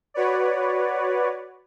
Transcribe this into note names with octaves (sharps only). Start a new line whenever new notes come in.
F#4 B4 C#5 D5